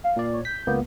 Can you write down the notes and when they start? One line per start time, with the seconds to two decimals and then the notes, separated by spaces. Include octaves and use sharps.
0.04 F5
0.16 A#2 D5
0.33 C#5
0.45 G6 B6
0.67 C#2 A#3 B3